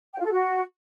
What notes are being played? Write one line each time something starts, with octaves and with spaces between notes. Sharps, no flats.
G5
F4
A4
F#4